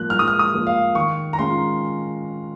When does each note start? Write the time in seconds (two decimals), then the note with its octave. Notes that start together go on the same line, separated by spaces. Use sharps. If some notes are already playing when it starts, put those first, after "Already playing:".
Already playing: G#2 F3 A#3 F#6
0.10 G#2 F6
0.19 D#6
0.28 F6
0.39 D#6
0.53 F3 A#3
0.67 F5
0.95 D#3 C#6
1.33 A#5
1.39 G#3 C#4 F4 C6